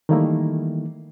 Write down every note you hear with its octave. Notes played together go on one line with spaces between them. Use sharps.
D#3 E3 G3 A3 A#3 E4